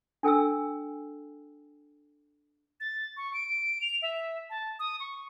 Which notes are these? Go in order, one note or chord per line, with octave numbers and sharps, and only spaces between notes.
D4 A4 G5 G#5 E6
A6
C#6
D7
F7
E5
A5
D#6
C#6